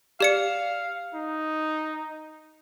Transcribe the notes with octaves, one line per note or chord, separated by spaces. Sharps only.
G4 D5 F5 C#7
D#4